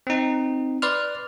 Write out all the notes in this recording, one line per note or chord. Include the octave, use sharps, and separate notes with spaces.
C4 D#4
B4 D5 C6 F6